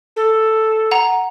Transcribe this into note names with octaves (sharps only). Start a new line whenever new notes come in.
A4
F#5 A#5